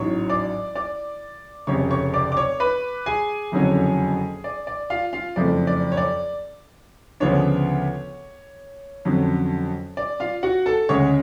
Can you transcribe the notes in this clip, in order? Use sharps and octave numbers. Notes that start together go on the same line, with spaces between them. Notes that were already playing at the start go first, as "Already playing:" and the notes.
Already playing: A1 G#2 F#3 C#5 C#6
D5 D6
D5 D6
F1 F2 C#3 C#5 C#6
C#5 C#6
D5 D6
D6
C#5 C#6
B4 B5
G#4 G#5
F#1 F2 D3 F#3 C#4
D5
D5
F4 F5
F4 F5
F#1 F2 F3 A3 D5
D5
C#5
D5
D2 C#3 F3 B3 D4 C#5
F2 D3 F#3 C#4
D5
F4 F5
F#4 F#5
A4 A5
D2 C#3 G#3 C#4 C#5 C#6